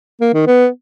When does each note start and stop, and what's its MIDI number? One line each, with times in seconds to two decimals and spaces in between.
0.21 0.29 58
0.34 0.45 51
0.47 0.68 59